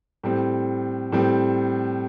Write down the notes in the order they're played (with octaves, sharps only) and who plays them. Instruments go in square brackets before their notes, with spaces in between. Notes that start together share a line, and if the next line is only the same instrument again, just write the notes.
[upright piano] A2 G3 C4
A2 G3 C4